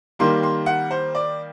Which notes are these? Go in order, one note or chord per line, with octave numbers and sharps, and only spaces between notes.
D#3 G3 A#3 C6
C6
F#5
C5
D5